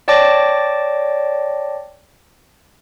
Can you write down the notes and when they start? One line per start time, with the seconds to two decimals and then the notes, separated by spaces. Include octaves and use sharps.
0.08 C#5 D5 G5 A5 D6 A#6